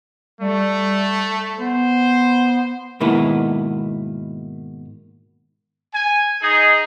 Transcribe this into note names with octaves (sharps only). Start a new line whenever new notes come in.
G3 A3
B3 C5
G#2 B2 D#3 A#3 E4 B4
G#5
D#4 G#4